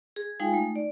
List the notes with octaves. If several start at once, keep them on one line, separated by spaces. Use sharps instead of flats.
G#4
G#3 D#4 F4 F5 G5 G#5
A3 D#4
D5